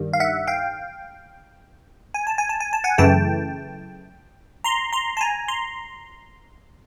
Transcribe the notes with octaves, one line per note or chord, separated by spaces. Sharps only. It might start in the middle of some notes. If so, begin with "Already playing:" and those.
Already playing: G2 D#3 G3
F5
E5 F#5
F5 G5
G#5
A5
G#5
A5
G#5
A5
F#5 G#5
F#2 C#3 E3 A3 G5 A5
A#5 C6
A#5 C6
A5
G#5 A#5
A#5 C6